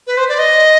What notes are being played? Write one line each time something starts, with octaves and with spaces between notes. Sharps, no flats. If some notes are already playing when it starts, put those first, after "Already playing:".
B4
C5
D5
D#5